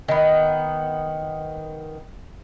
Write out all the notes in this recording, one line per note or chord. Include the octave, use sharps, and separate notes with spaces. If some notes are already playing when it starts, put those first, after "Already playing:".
D#3 B3